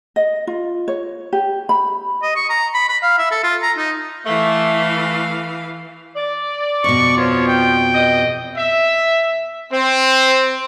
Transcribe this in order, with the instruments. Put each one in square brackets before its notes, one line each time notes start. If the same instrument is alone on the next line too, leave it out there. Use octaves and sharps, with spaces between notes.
[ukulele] D#5
F4
C#5
G4
B5
[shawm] D#5
C#6
A#5
B5
B5
F5
E5
A4
F4
A#5
D#4
[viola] E3 F5 [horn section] A3
[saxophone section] D5
[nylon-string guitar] F2 B2 [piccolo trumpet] C#6
[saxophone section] F3 B3 F4 [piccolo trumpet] C#5
[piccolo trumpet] G5
[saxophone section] E2 D#5
[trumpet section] E5
C4